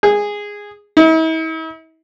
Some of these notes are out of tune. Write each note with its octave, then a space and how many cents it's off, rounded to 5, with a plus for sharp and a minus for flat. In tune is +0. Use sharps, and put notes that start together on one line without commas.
G#4 -10
E4 -45